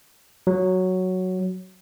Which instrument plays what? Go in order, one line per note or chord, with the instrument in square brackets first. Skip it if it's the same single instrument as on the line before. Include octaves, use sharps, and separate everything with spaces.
[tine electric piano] F#3